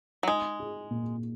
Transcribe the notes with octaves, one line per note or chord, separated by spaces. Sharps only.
F#3
G#3 D#4
G#4
A#2